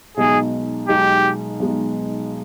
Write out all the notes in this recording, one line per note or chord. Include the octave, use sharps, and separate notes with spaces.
B1 B2 G#3 D#4 G#4
B1 B2 G#3 D#4 G4
B1 B2 G#3 D#4